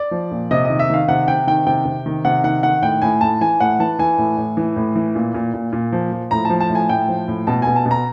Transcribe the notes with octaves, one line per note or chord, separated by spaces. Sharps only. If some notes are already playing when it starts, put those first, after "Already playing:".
Already playing: D5
F3
A#2
C3 D#5
D#3 D#5
E5
D#3 F5
C3 F#5
C3 G5
D#3 G5
C3 G5
C3
D#3
C3 F#5
D#3 F#5
D#3 F#5
A2 G5
A2 G#5
A2 A5
E3 G#5
A2 F#5
E3 A5
E3 G#5
A2
A2
E3
A2
E3
A#2
A#2
A#2
A#2
F3
F3
A2 A#5
F3 A5
A5
A2
G#5
A2 G5
F3
A2
B2 A5
B2 G#5
A5
B2
A#5